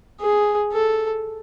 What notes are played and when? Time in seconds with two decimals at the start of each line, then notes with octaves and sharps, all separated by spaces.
0.21 G#4
0.72 A4